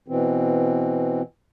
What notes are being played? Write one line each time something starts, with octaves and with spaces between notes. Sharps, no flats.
B2 E3 C4